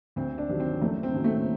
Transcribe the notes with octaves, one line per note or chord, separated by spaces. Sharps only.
D2 C4
D4
C3 D#3 F#3
C4
F#1 A3
C4
F#2 D#3 F#3
A3